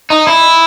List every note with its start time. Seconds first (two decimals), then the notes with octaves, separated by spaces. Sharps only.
0.10 D#4
0.27 E4